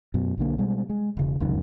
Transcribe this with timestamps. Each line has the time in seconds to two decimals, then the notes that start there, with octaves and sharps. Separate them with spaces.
0.14 F#2 B2
0.38 B1 D3 A#3
0.58 B2 G3 G#3
0.90 G#3
1.17 E1 C#3
1.40 F1 C#2 F#2 D#3